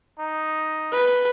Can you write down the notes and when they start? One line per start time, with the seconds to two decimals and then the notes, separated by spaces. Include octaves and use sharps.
0.19 D#4
0.93 B4